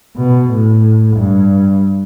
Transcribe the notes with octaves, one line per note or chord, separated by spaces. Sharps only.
B2
A2
G2